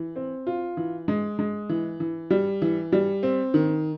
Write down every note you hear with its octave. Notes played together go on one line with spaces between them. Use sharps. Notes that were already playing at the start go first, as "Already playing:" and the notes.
Already playing: E3
C4
F4
E3
G#3
G#3
E3
E3
G3
E3
G3
C4
D#3